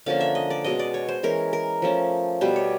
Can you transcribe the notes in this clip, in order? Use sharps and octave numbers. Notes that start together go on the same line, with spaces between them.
D3 F3 A#3 C#4 F5
E5
D#5
D5
B2 G#3 C#4 D#5
D5
C#5
C5
E3 G#3 C#4 A#4
A#4
F3 A3 C#4
B2 G3 B3 C5
C#5